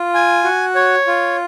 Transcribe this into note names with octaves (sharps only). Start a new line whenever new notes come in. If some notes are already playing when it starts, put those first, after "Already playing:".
Already playing: F4
G#5
F#4
C#5
F4